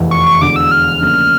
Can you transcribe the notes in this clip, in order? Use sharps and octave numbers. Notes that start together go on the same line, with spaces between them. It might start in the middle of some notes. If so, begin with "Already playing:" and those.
Already playing: F1 E2 E3
C#6
C#6
E1 E2 D3 D6
E6
F6
D2 C#3 F3 A#3 D4